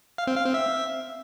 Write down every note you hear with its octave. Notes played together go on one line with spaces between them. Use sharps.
F5
C4
F5
C4
E5